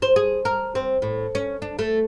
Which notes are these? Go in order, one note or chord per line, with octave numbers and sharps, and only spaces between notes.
C5
G#4
A#4
C4
A2
C#4
D4
A3